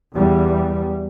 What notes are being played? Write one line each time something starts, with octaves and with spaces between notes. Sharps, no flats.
E2 G3